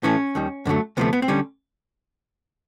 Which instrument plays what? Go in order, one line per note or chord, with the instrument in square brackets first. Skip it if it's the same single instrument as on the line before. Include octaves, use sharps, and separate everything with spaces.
[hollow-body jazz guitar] A2 E3 A3 C#4
D#2 D#3 G3
F#2 D3 F#3 A3
D2 C3 F3 A3 B3
B3
C4
D3 G3 C#4